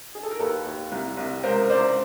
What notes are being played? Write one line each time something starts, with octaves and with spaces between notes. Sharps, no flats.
G#4
A4
A#4
D#2 A4 B4
D#2
C2
C2
C#2 A#4 C5
C#2 C5 D5